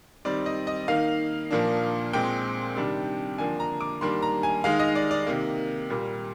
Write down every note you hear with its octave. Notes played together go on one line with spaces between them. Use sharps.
D#3 G3 C4 D#4 D5
D#5
D#5
D#3 A#3 D#4 F5
A#2 F3 A#3 D4
A#2 G#3 C4 G5
C3 D#3 G3 D4
D3 F3 A#3 D4 G#5
A#5
D6
D#3 G3 A#3 D4 C6
A#5
G#5
D#3 G#3 D#4 F5
D#5
D5
D5
C3 D#3 A#3
A#2 G3 A#3